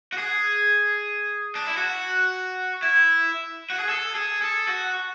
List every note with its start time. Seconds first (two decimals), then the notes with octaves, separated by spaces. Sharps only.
0.13 F#4
0.18 G#4
1.55 D4
1.67 E4
1.77 F#4
2.83 E4
3.70 F#4
3.79 G#4
3.89 A4
4.15 G#4
4.42 A4
4.68 F#4